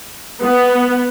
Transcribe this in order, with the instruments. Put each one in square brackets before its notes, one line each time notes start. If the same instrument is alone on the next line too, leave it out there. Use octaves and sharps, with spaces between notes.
[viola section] B3